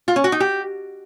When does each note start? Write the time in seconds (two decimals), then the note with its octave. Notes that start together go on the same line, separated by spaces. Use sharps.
0.08 F4
0.16 C#4
0.24 F#4
0.32 D#4
0.40 G4